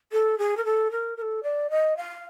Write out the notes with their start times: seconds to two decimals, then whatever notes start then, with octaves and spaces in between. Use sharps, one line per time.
0.12 A4
0.38 G#4
0.57 A#4
0.65 A4
0.91 A#4
1.17 A#4
1.22 A4
1.43 D5
1.70 D#5
1.97 F5